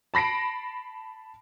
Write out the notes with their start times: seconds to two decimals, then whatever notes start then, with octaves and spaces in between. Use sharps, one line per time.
0.14 A5 B5 A#6 C7 D7